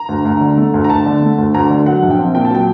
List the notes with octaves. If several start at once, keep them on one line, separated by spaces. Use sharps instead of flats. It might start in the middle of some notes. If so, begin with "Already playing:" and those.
Already playing: A#5
D2
D2
D3
A3
D2
A#5
D2 A5
D3
A3
D2
D2 A#5
D3
F#3 F#5
A#1
G5
C4
A#2 G5
A5
F#3 G5